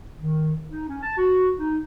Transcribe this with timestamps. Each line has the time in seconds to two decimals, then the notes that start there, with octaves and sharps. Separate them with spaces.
0.19 D#3
0.69 D#4
0.88 C#4
1.03 A5
1.17 F#4
1.59 D#4